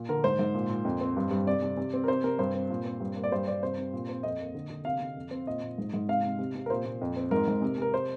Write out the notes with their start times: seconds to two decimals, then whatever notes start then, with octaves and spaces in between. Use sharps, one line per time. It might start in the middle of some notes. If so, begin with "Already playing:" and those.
Already playing: A#2
0.09 D3 A#4
0.24 G#2 C5
0.39 G#2
0.54 A#2
0.69 A#2
0.85 F2
1.01 C4
1.17 G2
1.31 G2
1.47 C3 D5
1.62 C3
1.77 C3
1.94 C4
2.04 A#4
2.08 C3 C5
2.24 C3 A#4
2.39 G2 C5
2.54 C4
2.70 A#2
2.85 C4
3.00 G2
3.16 A#3
3.24 D5
3.32 G2 C5
3.47 G2 D5
3.63 C3 C5
3.78 C3
3.93 A#2
4.09 C4
4.23 F2 D#5
4.40 A#3
4.55 D3
4.70 D3
4.85 C3 F5
5.00 C3
5.17 F2
5.31 C4
5.47 A#2 D#5
5.63 A#2
5.78 G#2
5.94 G#2
6.08 C3 F5
6.23 C3
6.39 C3
6.55 C3
6.66 A#4
6.70 A#2 C5
6.85 A#2
7.01 F2
7.16 C4
7.31 G#2 A#4
7.48 G#2
7.62 C3
7.78 C3 A#4
7.94 C5